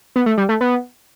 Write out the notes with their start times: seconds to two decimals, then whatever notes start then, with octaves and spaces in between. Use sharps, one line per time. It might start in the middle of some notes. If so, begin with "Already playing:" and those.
0.16 B3
0.26 A3
0.38 G3
0.49 A3
0.61 B3